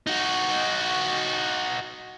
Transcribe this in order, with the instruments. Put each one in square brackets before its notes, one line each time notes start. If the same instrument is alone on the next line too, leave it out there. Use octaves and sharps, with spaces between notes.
[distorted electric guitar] D#4 F#4